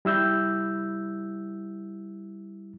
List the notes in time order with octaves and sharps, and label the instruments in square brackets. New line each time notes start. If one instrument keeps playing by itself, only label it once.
[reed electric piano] G3 E4 E6 G6